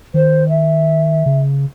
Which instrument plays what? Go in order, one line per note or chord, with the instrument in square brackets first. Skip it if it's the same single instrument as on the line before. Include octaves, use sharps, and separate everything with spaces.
[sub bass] D#3 [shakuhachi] C5
[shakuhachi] E5
[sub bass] C#3